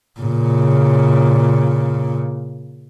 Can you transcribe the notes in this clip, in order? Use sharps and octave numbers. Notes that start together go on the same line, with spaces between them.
A#2 C#3